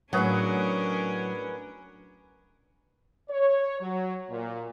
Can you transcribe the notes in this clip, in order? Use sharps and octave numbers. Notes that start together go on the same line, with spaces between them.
A2 F#3 C#4 D4 F#4 G#4 A#4 B4
C#5
F#3
A#2